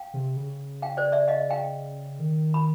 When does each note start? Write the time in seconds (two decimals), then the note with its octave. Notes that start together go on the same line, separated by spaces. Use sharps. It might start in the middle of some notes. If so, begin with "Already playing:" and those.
Already playing: F5 G5
0.14 C3
0.37 C#3
0.82 F5 G5
0.97 C5 D5
1.12 D5 E5
1.28 D#5 F5
1.50 F5 G5
2.19 D#3
2.54 B5